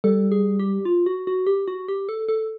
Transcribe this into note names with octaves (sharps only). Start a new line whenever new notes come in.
G3 A4
G#4
G4
F4
F#4
F#4
G4
F#4
G4
A4
A4